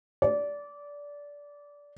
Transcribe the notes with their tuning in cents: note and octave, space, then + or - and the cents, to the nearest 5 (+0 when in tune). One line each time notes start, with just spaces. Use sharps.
D5 -20